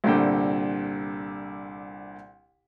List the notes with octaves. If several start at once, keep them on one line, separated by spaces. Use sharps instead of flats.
C2 A#2 D3 G5